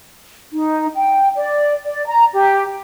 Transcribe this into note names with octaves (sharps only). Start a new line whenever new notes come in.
D#4
G5
D5
D5
A#5
G4